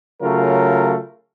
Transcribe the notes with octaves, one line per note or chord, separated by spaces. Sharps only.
C#3 F#3 A3 F4 A#4